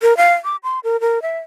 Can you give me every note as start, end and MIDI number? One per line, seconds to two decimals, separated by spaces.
0.02 0.16 70
0.17 0.33 77
0.44 0.56 86
0.63 0.79 84
0.84 1.00 70
1.01 1.22 70
1.22 1.38 76